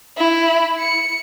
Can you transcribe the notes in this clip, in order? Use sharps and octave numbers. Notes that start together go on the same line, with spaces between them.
E4
C#7